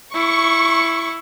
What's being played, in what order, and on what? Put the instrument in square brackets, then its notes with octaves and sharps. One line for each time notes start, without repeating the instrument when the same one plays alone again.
[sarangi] E4 [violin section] C#6